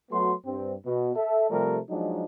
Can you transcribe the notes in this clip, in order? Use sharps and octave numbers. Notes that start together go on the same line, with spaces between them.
F#3 A3 B3 F#4 C6
G2 C4
B2
A4 E5
C3 F3 G3 A3 A#4
F3 F#3 G#3 D4 D#4